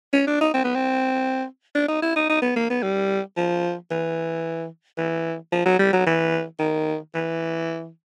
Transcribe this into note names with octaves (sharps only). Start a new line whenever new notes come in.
C#4
D4
D#4
C4
B3
C4
D4
D#4
E4
D#4
D#4
B3
A#3
B3
G3
F3
E3
E3
F3
F#3
G3
F#3
E3
D#3
E3